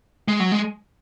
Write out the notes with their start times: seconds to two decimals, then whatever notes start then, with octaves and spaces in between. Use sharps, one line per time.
0.28 G#3
0.40 F#3
0.52 G#3